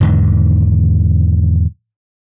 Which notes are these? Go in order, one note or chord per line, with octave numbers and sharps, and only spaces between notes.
E2 G#2 D3 D#3